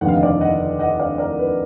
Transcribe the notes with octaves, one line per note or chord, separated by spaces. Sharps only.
F1 D#2 D3 F#5
F5
D#5
D5 F5
D#5 F#5
D#5 F#5
D5 F5
A#4 D5
B4